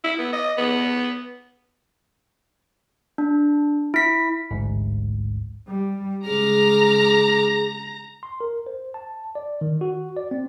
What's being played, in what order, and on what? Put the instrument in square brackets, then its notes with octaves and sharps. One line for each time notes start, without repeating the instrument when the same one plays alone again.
[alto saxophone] E4
B3
D#5
B3
[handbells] D4
E4 B6
[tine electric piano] A1 D2 G#2
[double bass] G3
[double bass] C#3 G#3 [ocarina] G#4 [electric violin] A#5 A#6 [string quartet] D6 F6
[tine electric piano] C6
A#4
C5
A5
D5
D#3
F#4
D5
C4